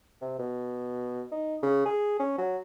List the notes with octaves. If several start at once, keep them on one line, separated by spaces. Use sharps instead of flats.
C3
B2
D#4
C#3
G#4
C#4
F#3